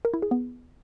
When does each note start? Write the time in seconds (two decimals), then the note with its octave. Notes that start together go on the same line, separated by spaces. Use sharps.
0.05 A#4
0.14 E4
0.22 G#4
0.31 B3